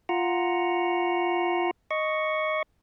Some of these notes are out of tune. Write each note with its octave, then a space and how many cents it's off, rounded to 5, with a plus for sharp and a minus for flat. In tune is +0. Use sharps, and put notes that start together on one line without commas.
F4 +0 F#5 +0 A#5 +0
D#5 +0 C#6 +0